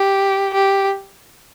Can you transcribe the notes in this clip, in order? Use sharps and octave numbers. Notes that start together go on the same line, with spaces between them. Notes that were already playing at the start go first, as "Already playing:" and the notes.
Already playing: G4
G4